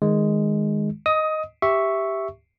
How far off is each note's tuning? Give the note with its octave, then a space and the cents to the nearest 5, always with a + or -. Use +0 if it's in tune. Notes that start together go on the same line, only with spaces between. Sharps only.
D#3 +0 G#3 +0
D#5 +0 D#6 +20
G4 +0 E5 +0 C#6 +0